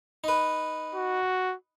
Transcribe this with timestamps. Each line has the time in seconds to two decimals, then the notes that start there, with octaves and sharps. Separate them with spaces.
0.24 D#4 B4
0.95 F#4